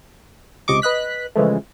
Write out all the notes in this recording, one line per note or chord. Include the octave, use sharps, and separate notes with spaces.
C#2 C3 D#5 C#6 D6
B4 D#5 F#6 B6
C#3 E3 F3 G#3 A3